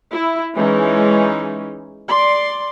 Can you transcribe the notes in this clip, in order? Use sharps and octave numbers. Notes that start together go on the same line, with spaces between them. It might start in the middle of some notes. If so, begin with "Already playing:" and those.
E4
E3 G#3 C#4 D#4
D5 C6